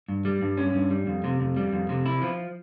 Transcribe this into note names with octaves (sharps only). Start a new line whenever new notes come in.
G2
G3
G2
C#4
G2
G3
F2
C3
F2
G3
F2
C3
E4
F3